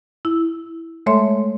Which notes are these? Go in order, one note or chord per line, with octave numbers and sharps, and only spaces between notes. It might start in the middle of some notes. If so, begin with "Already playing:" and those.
E4
G#3 A3 A4 C#5 E5 C6